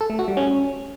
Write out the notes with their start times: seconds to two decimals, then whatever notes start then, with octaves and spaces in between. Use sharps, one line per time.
0.01 A4
0.10 A3
0.19 F#4
0.28 G3
0.37 C#4